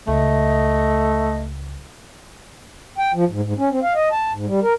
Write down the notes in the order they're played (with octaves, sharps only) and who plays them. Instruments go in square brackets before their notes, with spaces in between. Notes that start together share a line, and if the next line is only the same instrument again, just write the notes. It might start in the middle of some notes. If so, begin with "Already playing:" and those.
[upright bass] C#2 [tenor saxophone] A3 [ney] D#5
[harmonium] G5
F3
G#2
G#2
C#4
C4
F5
D#5
A5
G#2
G3
A#4